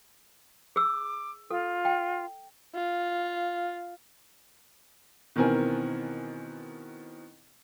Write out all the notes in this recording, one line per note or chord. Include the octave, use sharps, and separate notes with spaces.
G#4 D6 E6
F4 A4
G5
F4
B2 D#3 E3 C4 A#4 G#5